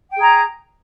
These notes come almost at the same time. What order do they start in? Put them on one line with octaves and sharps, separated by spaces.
G5 G#4 A#5